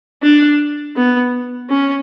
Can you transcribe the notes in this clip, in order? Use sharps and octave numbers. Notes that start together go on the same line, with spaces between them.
D4
B3
C#4